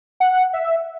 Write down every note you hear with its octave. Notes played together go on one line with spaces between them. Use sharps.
F#5
E5